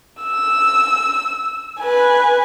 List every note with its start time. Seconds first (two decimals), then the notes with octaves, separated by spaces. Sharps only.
0.23 E6
1.80 B4 G#5